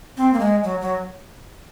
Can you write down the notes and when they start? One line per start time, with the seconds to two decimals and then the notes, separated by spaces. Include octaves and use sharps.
0.17 C4
0.33 A#3
0.40 G#3
0.64 F#3
0.81 F#3